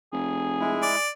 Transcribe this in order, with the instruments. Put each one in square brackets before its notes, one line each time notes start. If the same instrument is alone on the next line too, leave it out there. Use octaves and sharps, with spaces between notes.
[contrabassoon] F1 [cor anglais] G#4
[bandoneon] G#3 E4
[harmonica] D5